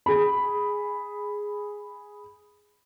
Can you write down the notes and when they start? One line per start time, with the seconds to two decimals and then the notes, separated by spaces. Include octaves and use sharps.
0.06 G#4 B5